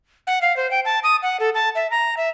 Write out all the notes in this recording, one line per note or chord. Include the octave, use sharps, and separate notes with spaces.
F#5
F5
C5
G5
A5
D#6
F#5
A4
A5
E5
A#5
E5